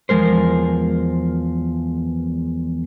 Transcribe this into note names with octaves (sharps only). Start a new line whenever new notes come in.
E2 F3 G#3 A#4 C5